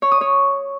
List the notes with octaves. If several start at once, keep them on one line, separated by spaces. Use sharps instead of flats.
C#5
D#6
C#5